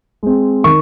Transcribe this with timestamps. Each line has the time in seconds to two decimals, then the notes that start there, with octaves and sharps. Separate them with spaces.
0.23 G#3 C4
0.64 D#3 C#6